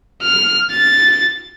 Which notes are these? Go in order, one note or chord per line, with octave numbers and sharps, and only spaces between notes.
F6
A6